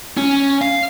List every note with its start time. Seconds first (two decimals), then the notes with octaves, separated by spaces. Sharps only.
0.17 C#4
0.62 F5